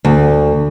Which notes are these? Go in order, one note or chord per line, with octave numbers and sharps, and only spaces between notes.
D2